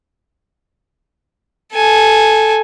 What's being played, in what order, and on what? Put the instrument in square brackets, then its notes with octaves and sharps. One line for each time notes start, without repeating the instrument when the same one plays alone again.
[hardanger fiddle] A4 G#5